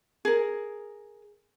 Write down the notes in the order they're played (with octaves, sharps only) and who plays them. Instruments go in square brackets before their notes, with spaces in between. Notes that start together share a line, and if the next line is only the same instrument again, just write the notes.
[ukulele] G#4 A#4